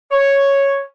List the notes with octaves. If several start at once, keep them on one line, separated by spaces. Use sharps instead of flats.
C#5